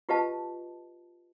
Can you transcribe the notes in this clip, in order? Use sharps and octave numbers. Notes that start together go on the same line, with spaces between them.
F4 G4 B4 D#5 F5 A5